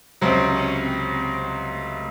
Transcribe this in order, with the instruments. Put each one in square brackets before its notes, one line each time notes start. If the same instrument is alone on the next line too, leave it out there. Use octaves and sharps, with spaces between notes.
[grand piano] C#2 C3 F#3 [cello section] C4
[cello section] C#4
C4
C4
F#3
A3